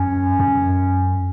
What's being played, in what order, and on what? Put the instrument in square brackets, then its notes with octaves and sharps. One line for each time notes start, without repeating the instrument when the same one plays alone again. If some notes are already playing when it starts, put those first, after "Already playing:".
Already playing: [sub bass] F#2 [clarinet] C#4
[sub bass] F#2